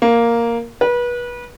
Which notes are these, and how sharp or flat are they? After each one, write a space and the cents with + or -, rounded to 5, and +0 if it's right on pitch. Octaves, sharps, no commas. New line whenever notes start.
A#3 +0
B4 -30